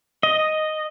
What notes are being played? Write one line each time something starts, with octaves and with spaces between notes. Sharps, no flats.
D#5